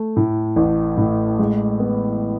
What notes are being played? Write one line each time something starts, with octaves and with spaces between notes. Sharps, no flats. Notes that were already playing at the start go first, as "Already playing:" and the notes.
Already playing: A3
A2
A1
A2
G#3
B3